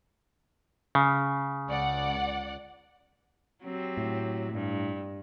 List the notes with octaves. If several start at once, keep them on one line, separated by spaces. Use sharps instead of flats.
C#3
C#2 D5 F#5
F#3 C4 G4
A2
G2